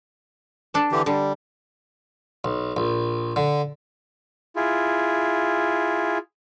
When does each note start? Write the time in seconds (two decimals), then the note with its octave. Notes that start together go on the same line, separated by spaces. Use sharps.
0.74 D4 A4
0.92 D3 E3 G4
1.06 D3 G3
2.44 B1
2.77 A#1
3.36 D3
4.56 E4 F4 G#4